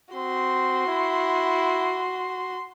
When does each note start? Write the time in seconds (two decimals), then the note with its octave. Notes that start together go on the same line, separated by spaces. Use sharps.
0.15 C4 F#4 C6
0.87 E4